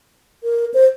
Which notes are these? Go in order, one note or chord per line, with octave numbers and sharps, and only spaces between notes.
A#4
C5